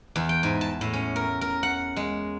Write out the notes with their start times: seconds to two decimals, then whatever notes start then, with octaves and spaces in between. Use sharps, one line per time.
0.16 E2
0.29 G5
0.43 G#2
0.61 A5
0.81 A2
0.93 C#4
1.16 A#4
1.41 A#4
1.63 F#5
1.96 G#3